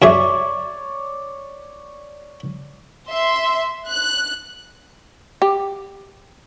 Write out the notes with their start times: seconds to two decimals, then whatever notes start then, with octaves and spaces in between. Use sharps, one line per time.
0.02 F#2 G#4 C#5 D5 E5
3.10 E5 C6
3.87 F#6
5.42 G4